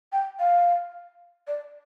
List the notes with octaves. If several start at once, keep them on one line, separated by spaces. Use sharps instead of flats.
G5
F5
D5